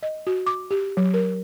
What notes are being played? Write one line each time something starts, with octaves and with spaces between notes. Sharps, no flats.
D#5
F#4
D6
G4
F#3
A#4